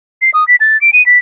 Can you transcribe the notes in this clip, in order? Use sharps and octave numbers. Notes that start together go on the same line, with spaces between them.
C7
D#6
B6
A6
D7
D#7
B6